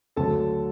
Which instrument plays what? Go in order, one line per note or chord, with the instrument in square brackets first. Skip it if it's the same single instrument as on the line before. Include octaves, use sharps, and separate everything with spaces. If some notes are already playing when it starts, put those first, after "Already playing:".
[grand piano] D2 D3 F#3 A4 A5